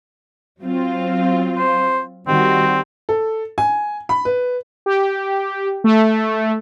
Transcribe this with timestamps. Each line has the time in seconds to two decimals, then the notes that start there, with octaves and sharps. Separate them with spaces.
0.61 F#3 C4 F4
1.58 C5
2.28 D#3 G3 C4 F#4
3.09 A4
3.58 G#5
4.09 B5
4.25 B4
4.86 G4
5.84 A3